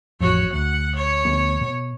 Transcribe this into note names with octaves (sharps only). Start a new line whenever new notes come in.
A1 F2 F#4 C#5
D2 F#5
C#5
D2 B3
B2